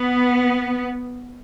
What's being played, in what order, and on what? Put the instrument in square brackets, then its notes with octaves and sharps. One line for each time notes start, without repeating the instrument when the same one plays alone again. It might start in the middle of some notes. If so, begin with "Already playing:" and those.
Already playing: [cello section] B3